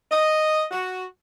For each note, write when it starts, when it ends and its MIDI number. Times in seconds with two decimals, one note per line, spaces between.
0.11 0.63 75
0.71 1.03 66